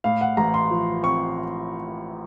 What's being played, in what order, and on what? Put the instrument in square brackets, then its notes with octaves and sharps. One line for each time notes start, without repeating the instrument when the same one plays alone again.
[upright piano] A2 F5
F#5
A1 A#5
C6
F3
C4 C#6